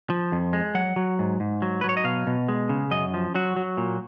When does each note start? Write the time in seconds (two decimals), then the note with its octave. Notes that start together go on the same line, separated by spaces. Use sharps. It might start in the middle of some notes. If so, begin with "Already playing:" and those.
0.10 F3
0.32 F2
0.53 G#3
0.75 F#3 F#5
0.96 F#3
1.19 G#2
1.40 G#2
1.62 F#3
1.81 B4
1.84 F#3
1.89 C#5
1.97 D#5
2.04 B2 F5
2.27 B2
2.49 G#3
2.69 C#3
2.91 F#2 D#5
3.14 F3
3.35 F#3 F#4
3.56 F#3
3.77 A#2